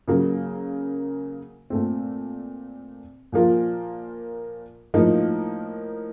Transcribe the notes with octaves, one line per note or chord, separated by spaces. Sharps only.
C#3 F#3 A#3
A#2 A3 C4
A#2 F3 A#3 F4
A2 F3 A#3 D#4